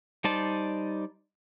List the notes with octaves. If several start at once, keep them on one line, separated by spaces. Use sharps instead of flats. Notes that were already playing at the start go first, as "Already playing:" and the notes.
G3 D#4 C5 D5 A5